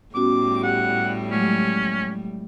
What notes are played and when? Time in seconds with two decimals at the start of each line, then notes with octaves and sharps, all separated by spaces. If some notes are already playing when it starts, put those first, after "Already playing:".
0.15 A2 G3 B3 C#4 F#4 D6
0.63 G4 F#5
1.31 F#3 G#3 A3 C#4